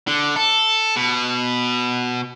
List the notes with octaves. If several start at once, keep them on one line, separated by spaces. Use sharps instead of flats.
D3
A4
B2